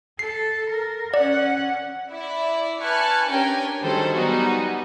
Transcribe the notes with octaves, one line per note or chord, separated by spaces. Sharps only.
A4 C7
A#4
C#4 D5 F#5
E4 D5 E5
B4 G#5 A5 C#6 F6 F#6
C#4 D4 G4 A#4 G5 G#5
D#3 F#3 G3 G#4 A4 C5
F#3 G3 B3 D#4 F#4 G#4